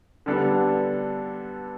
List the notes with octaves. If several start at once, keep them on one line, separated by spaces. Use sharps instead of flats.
D3 G3 B3 D4 A4